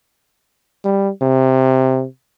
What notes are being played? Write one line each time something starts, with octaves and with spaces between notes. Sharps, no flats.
G3
C3